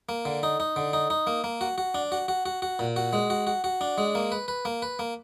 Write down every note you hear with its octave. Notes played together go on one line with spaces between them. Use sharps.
A#3
D3
D#4
D#4
D3
D#4
D#4
A#3
A#3
F#4
F#4
D4
F#4
F#4
F#4
F#4
A#2
F#4
G#3
F#4
F#4
F#4
D4
G#3
A#3
B4
B4
A#3
B4
A#3